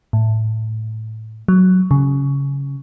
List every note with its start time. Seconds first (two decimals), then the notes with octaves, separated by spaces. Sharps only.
0.13 A2
1.48 F#3
1.91 C#3